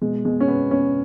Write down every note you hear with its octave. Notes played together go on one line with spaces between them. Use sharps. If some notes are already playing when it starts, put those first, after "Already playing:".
B2 G#3
B2 G#3
C#4
B2 B3
B2 C#4